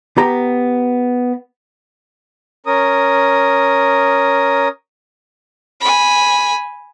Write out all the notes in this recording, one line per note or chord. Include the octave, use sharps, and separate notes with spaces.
B3 G4 A#5
C#4 A#4 D#6
G#5 B5